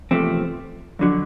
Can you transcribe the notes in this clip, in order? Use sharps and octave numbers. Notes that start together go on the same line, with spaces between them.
E2 C3 F3 A3 C4
F2 D3 F#3